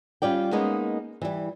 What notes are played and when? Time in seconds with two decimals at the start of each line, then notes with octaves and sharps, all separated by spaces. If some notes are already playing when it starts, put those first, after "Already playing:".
0.22 G3 C#4 F4 D5 G5
0.52 G#3 A#3 B3 C#4 D#4 G#4
1.22 E3 G3